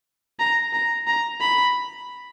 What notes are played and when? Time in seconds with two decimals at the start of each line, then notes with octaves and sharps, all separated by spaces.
0.40 A#5
0.73 A#5
1.07 A#5
1.41 B5